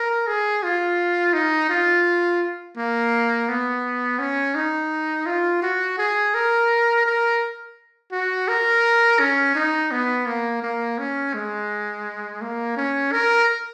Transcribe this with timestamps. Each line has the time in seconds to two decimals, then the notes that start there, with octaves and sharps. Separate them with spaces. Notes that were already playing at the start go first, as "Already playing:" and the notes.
Already playing: A#4
0.27 G#4
0.63 F4
1.34 D#4
1.70 F4
2.77 A#3
3.48 B3
4.19 C#4
4.55 D#4
5.26 F4
5.62 F#4
5.98 G#4
6.34 A#4
7.06 A#4
8.12 F#4
8.48 A#4
9.20 C#4
9.55 D#4
9.91 B3
10.26 A#3
10.62 A#3
10.99 C#4
11.34 G#3
12.42 A#3
12.77 C#4
13.12 A#4